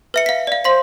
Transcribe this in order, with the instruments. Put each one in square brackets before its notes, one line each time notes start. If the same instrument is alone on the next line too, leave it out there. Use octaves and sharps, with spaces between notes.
[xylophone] B4 E5 C#7
F5 B6
D5 F5
[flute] C5 [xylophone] F5 C6 B6